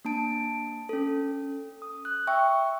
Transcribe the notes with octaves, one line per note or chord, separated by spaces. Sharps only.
A#3 D4 A5 D7
C#4 A4
D#6
F#6
E5 G5 C#6 E6